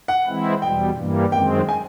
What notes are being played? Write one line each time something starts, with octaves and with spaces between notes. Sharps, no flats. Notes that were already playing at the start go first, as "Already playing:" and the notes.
F#5
E3 G#3 C4 E4
E2 B2 G3 G5
G2 E3 G3 A#3
F#2 D#3 G#3 C4 G5
G#5